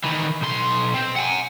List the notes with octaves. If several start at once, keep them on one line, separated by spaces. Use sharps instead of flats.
D#3 E3
B1 C6
C4
F#5 G#5